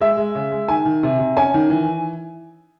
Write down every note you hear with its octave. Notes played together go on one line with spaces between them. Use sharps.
G#3 E5
G#3
C#3
G#3
D#3 G#5
D#3
C3
C3
C#4 G#5
D#3
E3